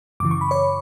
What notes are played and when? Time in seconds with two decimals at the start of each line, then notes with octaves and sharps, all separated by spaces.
0.20 F#2 C#3 E3 D6
0.31 C#6
0.41 B5
0.51 C#5 C#6